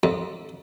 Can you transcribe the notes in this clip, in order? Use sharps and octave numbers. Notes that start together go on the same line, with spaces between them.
F2